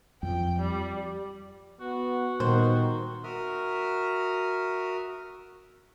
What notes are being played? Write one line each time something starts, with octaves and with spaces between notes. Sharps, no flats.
F2 F3 G5
G3
B3 F#4
A#2 D#3 G3 B3 C5
F#4 A#4 E5 D#6 F6